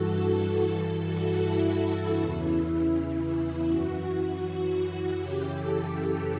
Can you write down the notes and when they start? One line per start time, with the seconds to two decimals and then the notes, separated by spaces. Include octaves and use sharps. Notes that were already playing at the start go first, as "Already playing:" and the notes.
Already playing: G2 E3 F#4 A4
0.67 G2 E3 A4
1.04 F#4
1.43 E4
2.18 E2 C#3 E3
3.68 F#2 E3 F#4
5.20 F#2 C#3 E3 G4
5.57 A4